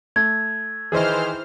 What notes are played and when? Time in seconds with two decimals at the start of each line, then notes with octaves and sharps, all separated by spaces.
0.16 A3 G#6
0.92 D#3 E3 D#4 G#4 C5 F6